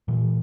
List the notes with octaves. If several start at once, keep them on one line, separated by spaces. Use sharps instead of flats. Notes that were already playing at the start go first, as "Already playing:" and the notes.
A#2 E3